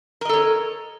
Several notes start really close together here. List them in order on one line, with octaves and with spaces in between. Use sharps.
A#4 D#5 A4 C#5